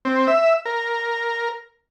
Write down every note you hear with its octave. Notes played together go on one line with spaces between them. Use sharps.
C4
E5
A#4